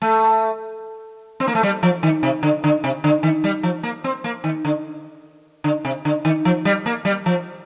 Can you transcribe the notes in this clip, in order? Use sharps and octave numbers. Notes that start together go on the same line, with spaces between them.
A3
C4
A#3
A3
G3
F3
D#3
C3
D3
D3
C3
D3
D#3
G3
F3
A#3
C4
A#3
D#3
D3
D3
C3
D3
D#3
F3
G3
A#3
G3
F3